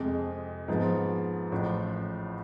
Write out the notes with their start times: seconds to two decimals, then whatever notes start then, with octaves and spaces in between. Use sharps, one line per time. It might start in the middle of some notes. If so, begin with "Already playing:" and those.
Already playing: F2 C3 G#3
0.68 G#2 F3 B3
1.52 A1 A2 F3